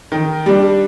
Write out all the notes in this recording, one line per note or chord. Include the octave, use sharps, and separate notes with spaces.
D#3
G3 D4